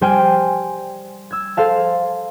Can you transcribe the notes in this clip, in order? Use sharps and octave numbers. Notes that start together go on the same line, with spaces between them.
G3 C5 G5 G#5 F6
E6 G#6
A4 C5 F5 A5